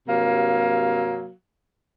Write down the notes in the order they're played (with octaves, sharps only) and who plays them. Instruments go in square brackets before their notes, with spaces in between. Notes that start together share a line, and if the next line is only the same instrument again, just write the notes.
[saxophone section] G2 C3 F#3 A#3 F5